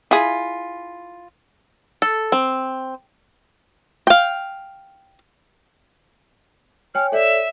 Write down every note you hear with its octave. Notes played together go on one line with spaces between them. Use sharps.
E4 F4 G#4 B5
A4
C4
F5 G5
C#5 G5 G#5 F6
A4 C#5 D5 E5